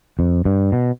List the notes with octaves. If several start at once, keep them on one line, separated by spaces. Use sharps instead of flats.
F2
G2
B2